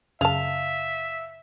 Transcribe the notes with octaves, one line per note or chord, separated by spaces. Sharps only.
F#2 C#3 G#4 E5 F5 A5